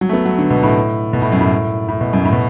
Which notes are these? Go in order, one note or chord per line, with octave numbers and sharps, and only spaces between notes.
F#3
A3
B3
F#3
D3
B2
A2
B2
A2
F#2
A2
A2
B2
F#2
A2
B2